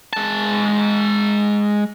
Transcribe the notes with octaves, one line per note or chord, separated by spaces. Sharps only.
G#3 A5